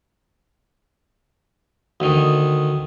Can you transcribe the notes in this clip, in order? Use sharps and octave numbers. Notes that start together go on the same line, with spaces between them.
D2 D#3